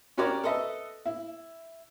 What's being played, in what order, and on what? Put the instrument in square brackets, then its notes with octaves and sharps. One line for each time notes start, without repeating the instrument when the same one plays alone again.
[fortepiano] C#4 F#4 G4 A#4 C#5 D5
A4 B4 D#5 E5
E4